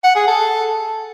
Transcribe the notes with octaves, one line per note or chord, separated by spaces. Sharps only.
F#5
G#4
A4